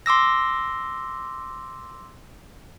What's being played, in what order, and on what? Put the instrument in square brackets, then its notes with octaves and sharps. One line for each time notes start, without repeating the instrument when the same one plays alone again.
[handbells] C6 D6 E6 A#6